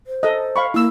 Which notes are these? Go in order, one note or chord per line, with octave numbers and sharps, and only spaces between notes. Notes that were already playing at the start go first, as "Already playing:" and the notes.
C5
A4 D#5
F5 B5 C#6
A#3 E4 E6